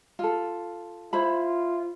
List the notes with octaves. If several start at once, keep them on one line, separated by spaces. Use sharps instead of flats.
F4 A4
E4 F4 C5 B5